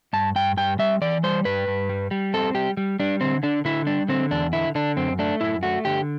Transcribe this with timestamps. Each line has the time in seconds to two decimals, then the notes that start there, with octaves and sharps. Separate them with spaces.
0.13 G2 A5
0.36 G2 G5
0.57 G2 G5
0.79 G3 E5
1.02 E3 D5
1.23 G3 C5
1.45 G2 B4
1.68 G2
1.89 G3
2.11 G3
2.34 C4 A4
2.54 G3 G4
2.77 G3
2.99 G3 D4
3.21 D3 C4
3.43 D3 D4
3.65 D3 E4
3.87 G3 D4
4.09 D3 C4
4.31 E2 D4
4.53 D3 E4
4.75 D3 D4
4.96 F#2 C4
5.19 A3 D4
5.41 F#2 E4
5.63 A3 F#4
5.85 D3 G4